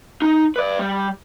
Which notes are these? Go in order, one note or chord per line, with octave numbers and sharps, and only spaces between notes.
D#4
B4 D5
G3